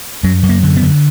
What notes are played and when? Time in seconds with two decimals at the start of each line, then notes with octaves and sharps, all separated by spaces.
0.23 F#2 F#3
0.43 F#2
0.49 A#3
0.63 D3
0.76 B3
0.83 D3